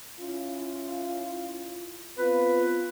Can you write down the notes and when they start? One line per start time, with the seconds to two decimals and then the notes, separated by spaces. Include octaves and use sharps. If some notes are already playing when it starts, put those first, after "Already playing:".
0.20 C#4 E4 F4
2.18 B3 C4 F4 B4